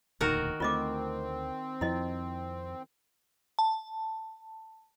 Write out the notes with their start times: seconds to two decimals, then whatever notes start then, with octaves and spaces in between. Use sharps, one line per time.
0.21 E1 D2 A#2 D#3 F#4 A#4
0.60 D2 A3 C4 F4 D#5 D6
1.81 F2 F3 E4 D#5
3.59 A5